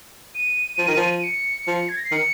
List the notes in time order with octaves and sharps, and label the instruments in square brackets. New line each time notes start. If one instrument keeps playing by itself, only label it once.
[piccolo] D#7
[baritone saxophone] F3
D#3
F3
[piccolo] D#7
C#7
[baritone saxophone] F3
[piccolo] G#6
A#6
C7
[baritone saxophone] D#3 [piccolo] C#7